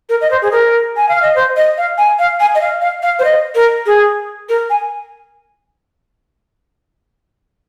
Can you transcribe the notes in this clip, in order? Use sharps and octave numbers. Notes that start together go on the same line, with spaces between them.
A#4
D#5
C5
G#4
A#4
G#5
F5
D#5
C5
D#5
F5
G#5
F5
G#5
D#5
F5
F5
F5
C5
D#5
A#4
G#4
A#4
G#5